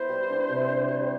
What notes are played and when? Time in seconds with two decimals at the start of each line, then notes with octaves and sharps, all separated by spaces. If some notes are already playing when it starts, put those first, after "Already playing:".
Already playing: B3 E4 B4 C5 E5
0.09 G3
0.30 D4
0.49 C3
0.69 D4
0.88 G3